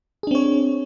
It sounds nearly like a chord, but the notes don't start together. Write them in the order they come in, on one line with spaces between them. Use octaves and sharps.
G#4 D4 C4 C#5